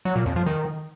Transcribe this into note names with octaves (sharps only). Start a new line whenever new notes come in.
F#3
A#2
F2
F3
D#3